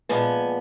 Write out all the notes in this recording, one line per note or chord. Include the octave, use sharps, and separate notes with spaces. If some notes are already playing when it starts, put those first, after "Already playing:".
A#2 F3 G#3 B3 G#5